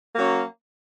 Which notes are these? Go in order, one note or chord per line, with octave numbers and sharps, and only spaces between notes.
F#3 A#3 C#4